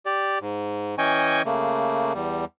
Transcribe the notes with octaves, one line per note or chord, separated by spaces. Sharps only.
G4 D5
G#2
E3 C#4 D#5 G5 G#5 C#6
C#3 A3 A#3
E2 G3